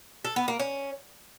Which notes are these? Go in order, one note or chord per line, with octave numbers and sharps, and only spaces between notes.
A4
B3
A#3
C#4